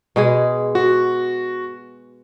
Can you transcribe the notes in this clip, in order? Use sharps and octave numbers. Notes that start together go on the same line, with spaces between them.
B2 G#3 G#4
F#4